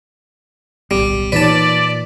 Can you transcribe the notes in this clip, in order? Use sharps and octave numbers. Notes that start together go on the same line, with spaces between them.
D1 B1 G3 B3
A#2 E3 D#4 B4 C#5 D5 A5